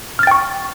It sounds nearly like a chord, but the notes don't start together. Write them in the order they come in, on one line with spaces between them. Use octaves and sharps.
F6 A6 G5 C#6